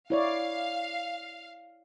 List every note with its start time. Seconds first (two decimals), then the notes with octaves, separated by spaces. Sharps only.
0.10 E4 C#5 D5 F5